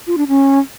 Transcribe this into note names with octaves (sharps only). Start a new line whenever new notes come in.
F4
D4
C#4